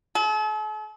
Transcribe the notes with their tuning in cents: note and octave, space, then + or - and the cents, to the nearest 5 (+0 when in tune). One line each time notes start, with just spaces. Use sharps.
A4 -45